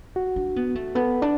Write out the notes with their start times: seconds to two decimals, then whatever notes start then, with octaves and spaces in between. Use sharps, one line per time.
0.16 F#4
0.36 D4
0.56 B3
0.75 A3
0.95 B3 A4
1.22 D4 D5